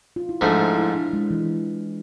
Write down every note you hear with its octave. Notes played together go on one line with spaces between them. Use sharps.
F4
E4
G#2 F3 A3 D4
E4
E4
D4
G#3
E3